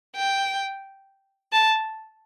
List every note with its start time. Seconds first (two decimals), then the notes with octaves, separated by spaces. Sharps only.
0.16 G5
1.52 A5